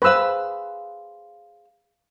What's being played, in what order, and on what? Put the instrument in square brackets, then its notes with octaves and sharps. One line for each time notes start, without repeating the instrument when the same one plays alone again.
[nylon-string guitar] G#4 C5 F5 [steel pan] B4 E6